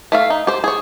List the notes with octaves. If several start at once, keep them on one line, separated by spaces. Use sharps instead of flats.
A3 E5 F5
D#4
G4 C5
G#4 C#5